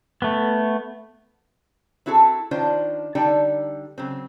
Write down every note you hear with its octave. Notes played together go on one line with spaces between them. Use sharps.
A3 B3
C4 E4 F#4 G#4 A4
D#3 C#4 D4 F4 C5 D5
D3 G3 D#4 D5 G5 A5
C#3 F#3 C4